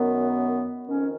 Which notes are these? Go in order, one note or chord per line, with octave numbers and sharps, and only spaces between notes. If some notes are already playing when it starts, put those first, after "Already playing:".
Already playing: F#2 D#3 B3
F2 D#3 C#4